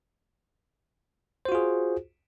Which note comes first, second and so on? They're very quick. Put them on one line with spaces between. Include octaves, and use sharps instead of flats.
C5 F#4 F4 G#4